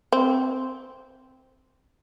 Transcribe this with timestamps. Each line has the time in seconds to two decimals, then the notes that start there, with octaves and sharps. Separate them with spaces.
0.12 C4